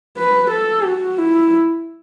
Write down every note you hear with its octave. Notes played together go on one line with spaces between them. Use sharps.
B4
A4
F#4
E4